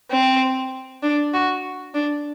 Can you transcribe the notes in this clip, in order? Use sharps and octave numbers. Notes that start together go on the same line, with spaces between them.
C4
D4
F#4
D4